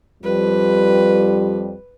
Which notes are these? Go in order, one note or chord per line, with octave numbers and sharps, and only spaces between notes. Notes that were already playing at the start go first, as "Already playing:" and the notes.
F2 F3 G3 B4